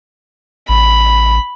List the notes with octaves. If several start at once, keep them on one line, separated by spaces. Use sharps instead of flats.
A1 B5